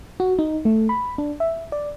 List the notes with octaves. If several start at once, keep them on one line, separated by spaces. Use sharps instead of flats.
F#4
D#4
A3
B5
D4
E5
D5